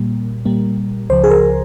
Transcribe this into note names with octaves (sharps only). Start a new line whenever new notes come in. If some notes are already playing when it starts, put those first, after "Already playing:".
Already playing: A#2 G3 A#3
A#2 G3 A#3
C#2 C#3 F3 C5
G#4
A#4